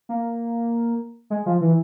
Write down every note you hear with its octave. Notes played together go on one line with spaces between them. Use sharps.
A#3
G#3
F3
E3